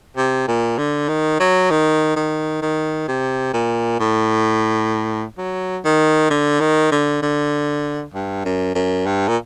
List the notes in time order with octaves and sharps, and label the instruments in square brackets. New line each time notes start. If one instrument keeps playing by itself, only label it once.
[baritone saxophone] C3
A#2
D3
D#3
F#3
D#3
D#3
D#3
C3
A#2
A2
F#3
D#3
D3
D#3
D3
D3
G2
F#2
F#2
G2
A#2